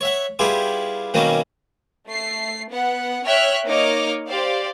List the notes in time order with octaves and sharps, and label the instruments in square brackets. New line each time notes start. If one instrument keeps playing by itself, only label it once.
[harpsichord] C#5 E5 F#5
G3 B3 E4 F4 G4 G#4
B2 D#3 F#3 G3 A#3 C#4
[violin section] A3 C7
B3 F#5
C#5 E5 G5 F6 F#6
A#3 D#4 C#5 D#5 D6 F6
G4 C5 D5 F5